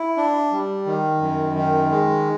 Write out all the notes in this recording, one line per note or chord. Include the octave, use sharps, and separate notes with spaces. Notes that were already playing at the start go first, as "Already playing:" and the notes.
Already playing: E4
D4
G3
D#3
F#2
D#3
G#3